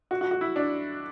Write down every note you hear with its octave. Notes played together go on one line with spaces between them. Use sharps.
F#4
F#4
F#4
E4
D4